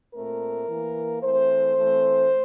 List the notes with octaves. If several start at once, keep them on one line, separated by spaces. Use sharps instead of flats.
A#2 A3 C4 A#4
E3 A#3
E3 A3 C4 C5
E3 A3 C4